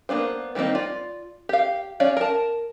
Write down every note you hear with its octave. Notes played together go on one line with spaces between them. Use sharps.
A#3 B3 D4 C5
D#3 G3 A#3 C4 D#4
F4 D5
G4 F5
C#4 C#5 D5 F5
A#4 A5